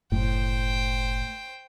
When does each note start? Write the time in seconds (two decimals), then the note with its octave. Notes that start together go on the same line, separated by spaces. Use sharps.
0.12 F#1 A2 C5 G5